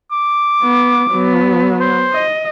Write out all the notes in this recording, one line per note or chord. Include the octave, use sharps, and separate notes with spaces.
D6
B3
F#3 B3
C5
D#5